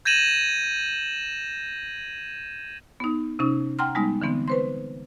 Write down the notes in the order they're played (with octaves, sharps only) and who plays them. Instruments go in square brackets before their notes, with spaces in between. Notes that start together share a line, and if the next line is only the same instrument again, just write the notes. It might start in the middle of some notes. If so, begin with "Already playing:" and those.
[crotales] G6 G#6 A#6 D#7 E7 F#7
[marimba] B3 D#4
C3 C#4 D#4
F#5 G5 A#5 C6 F6
G3 G#3 B3 D#4
D3 E3 B3 C4
B4 C5 C6